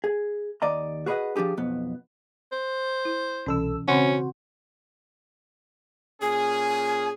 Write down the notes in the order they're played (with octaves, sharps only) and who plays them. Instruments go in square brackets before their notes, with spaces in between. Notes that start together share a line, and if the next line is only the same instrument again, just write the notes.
[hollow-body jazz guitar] G#4
D#2 D5 D#5 A#5
F#4 G#4 B4 C#5 D#5 F#5
F3 A3 D4 G4 G#4
B1 F2 B3
[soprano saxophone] C5
[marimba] E4
[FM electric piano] C2 A4 E6 [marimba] B2 E3 C#4
[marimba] C#3 C4 [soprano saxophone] C#4 [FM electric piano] F#4 C5
[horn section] A#2 C#4 G#4 [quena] G#5